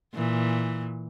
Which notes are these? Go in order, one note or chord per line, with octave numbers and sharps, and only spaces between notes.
A#2 E3